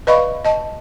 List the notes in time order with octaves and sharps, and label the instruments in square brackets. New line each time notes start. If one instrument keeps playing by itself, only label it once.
[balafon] B4 D5 D#5 F5 B5 C#6
D#5 A5